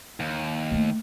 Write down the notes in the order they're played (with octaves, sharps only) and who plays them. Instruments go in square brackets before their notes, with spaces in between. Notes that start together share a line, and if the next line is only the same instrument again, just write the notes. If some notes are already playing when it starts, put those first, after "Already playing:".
[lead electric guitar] D#2
[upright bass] A3 A#3